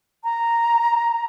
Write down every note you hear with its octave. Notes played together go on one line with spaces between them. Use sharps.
A#5